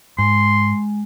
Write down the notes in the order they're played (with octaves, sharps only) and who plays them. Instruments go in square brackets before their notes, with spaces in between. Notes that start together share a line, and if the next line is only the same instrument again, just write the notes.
[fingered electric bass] G#2 [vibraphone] G#3 [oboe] C6